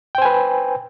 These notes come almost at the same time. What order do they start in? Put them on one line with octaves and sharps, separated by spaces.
G5 C5 G#5 B4